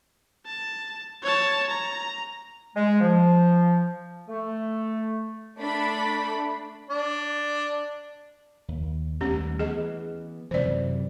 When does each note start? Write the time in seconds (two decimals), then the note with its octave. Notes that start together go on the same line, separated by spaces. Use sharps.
0.46 A5
1.23 C#5 A5
1.69 A#5
2.76 G#3
3.01 F3
4.28 A3
5.57 A3 D4 B5
6.90 D4
8.68 D#2
9.21 D#2 G3 A3 B3 C#4 G4
9.59 E3 B3 G#4 D#5
10.51 F#2 C3 E3 C5 D5